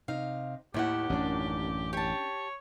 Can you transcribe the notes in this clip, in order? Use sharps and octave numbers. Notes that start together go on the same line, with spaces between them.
C3 D#4 F5
D#2 A2 D#3 E4 G4 F#5
A1 F#2 C#4 D4
G4 C#5 A5